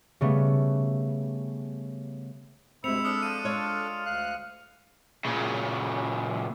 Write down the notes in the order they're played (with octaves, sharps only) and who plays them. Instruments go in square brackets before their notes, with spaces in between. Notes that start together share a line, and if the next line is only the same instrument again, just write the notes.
[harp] C#3 G3 A3 B3
[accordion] D2 C3 [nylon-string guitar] G#3 C4 [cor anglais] E4 [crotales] C#7 F7
[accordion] D4 A4 [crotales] D#6 F6 C#7
[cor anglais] F3 [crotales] D#7
[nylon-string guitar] G#3 C#5 D5 [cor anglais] F4
[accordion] D2 F#6 [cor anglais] F5
[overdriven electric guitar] A#2 C#3